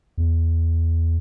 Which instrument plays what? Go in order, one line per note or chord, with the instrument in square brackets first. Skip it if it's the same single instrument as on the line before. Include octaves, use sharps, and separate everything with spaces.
[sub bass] E2